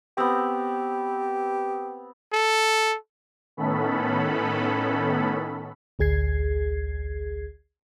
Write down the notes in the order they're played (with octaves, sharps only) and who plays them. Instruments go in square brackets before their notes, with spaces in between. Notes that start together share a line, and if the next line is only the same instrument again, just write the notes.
[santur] B3 C4 [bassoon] G4
[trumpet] A4
[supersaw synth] A2 D#3 B3 C#4 A4 B5
[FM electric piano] A1 D2 G#4 G#6 C7